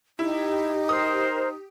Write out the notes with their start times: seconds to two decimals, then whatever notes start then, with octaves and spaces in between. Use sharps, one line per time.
0.19 D#4 E4 G4
0.89 A#4 C5 D#6